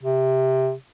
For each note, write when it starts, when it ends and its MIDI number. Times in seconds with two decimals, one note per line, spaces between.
0.03 0.72 48